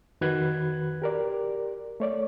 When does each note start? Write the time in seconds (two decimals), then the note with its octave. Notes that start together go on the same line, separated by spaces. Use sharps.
0.21 F2 D#3 F#4 B4 F#6 G#6
1.02 G4 A#4 D5
2.00 A3 C#5 D5